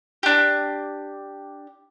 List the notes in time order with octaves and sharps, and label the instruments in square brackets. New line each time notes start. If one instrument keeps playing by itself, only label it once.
[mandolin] D4 G4